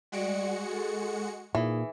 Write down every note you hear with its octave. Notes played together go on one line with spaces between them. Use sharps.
G3 G#3 F#4 D5 C#7
G#4 A4
A#2 E3 D#4 G#4